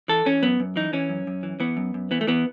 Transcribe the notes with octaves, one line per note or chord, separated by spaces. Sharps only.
E3 A4
E3 C#4
F#2 B3
F#2
E3 D#4
E3 C#4
F#2
F#2
E3
E3 B3
F#2
F#2
E3 B3
A3
E3 B3